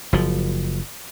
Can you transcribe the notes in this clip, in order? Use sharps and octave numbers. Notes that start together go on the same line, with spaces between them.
F#1 F3